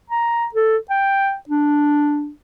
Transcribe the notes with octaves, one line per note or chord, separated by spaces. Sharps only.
A#5
A4
G5
D4